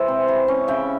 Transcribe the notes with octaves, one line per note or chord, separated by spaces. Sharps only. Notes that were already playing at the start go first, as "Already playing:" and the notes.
Already playing: E3 G#3 C5 E5
C3
E3
C#4
C#3 E5 G5